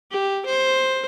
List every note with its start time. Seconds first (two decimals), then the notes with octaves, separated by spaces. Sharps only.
0.11 G4
0.46 C5